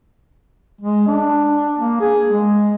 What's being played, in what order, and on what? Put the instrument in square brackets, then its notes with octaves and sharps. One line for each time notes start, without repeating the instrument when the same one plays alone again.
[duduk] G#3
D4
A#3
G#4
G#3